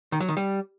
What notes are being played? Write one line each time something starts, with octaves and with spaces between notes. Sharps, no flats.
D#3
F#3
D#3
G3